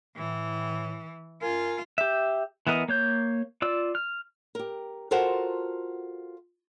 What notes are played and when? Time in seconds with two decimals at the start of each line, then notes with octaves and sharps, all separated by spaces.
0.17 A2 E3
1.42 F#2 F4 A#4 G#5
1.98 G4 E5
2.67 E3 B3 A#4 D#5
2.88 A#3 C#5 G6
3.62 F4 D5 E6
3.95 F6
4.55 G4 A#4
5.11 F4 F#4 A4 A#4 C5 F#5